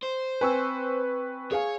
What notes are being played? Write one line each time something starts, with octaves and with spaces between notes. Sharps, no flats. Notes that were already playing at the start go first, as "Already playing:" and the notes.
C5
C4 B4 G5 G#5 C#6 E6
G#4 C#5 F5 G#5